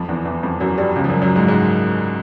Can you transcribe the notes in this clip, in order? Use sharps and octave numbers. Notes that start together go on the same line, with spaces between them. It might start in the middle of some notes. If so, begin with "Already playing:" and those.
Already playing: F2 F3
E2 E3
E2 E3
F2 F3
F#2 F#3
G2 G3
C#2 C#3
F3
F#2 F#3
F#2 F#3
G#2 G#3
G#2 G#3